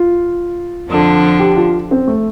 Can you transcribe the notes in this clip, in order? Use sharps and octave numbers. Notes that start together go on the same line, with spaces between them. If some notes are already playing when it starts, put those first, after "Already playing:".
Already playing: F4
F2 D3 F3 D4
G4
F4
C4
A3